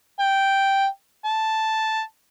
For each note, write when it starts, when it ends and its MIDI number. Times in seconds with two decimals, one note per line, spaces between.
0.20 0.86 79
1.25 2.01 81